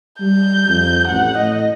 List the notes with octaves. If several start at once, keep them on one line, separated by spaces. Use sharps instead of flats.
G3 G6
F2
A1 F#5
A2 D#5